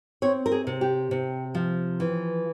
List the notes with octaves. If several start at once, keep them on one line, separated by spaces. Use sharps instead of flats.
C4 C#5
A#4
G#4
C3
G4
C3
F3
E3